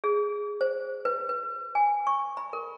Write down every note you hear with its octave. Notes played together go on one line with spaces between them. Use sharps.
G#4
C5
B4
B4
G#5
C#6
B5
A#4